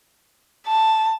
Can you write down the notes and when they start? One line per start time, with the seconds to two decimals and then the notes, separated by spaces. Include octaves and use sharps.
0.67 A5